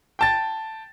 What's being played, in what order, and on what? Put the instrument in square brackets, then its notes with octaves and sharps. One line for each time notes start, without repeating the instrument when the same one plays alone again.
[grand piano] G5 A5 A6